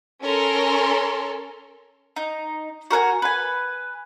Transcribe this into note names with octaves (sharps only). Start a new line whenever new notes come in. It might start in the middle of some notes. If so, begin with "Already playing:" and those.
C#4 A4 A#4 C6
D#4
F#4 A#4 F#5 G#5
B4 G#5